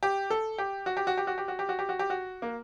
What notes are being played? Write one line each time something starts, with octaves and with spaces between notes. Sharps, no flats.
G4
A4
G4
F#4
G4
F#4
G4
F#4
G4
F#4
G4
F#4
G4
F#4
G4
F#4
A#3